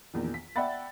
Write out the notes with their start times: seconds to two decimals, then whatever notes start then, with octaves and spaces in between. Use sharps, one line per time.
0.14 A#1 E2 D#3
0.34 B6
0.56 D5 E5 F#5 G5 B5 A6